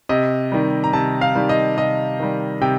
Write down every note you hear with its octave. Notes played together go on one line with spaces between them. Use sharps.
C3 D#5
D#3 G3
A#5
C3 A5
F5
D#3 G3
D#5
C3 D#5
D#3 G3
C3 G5